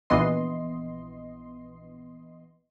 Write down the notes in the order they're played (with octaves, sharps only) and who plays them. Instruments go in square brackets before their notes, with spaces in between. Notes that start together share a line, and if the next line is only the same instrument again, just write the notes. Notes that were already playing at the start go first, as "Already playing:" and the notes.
[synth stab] A#1 E3 B3 D#5 C6